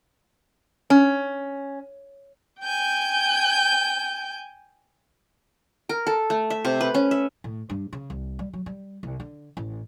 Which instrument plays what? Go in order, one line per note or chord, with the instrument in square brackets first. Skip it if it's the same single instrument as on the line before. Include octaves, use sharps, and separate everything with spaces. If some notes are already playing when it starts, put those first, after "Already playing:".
[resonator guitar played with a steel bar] C#4
[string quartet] G5 G#5 G6
[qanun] A#4
A4
A3
E5
C3
B4
C#4
E5
[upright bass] A2
G2
C#3
C2
G3
F#3
G3
C2
D3
A1